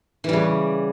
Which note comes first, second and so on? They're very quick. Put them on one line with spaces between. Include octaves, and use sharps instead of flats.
E3 G3 C#3